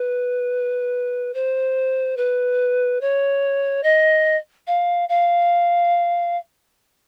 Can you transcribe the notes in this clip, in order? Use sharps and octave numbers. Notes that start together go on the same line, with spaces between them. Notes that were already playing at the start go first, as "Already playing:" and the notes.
Already playing: B4
C5
B4
C#5
D#5
F5
F5